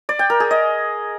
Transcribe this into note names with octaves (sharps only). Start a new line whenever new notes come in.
D5
G5
A#4
G#4
D#5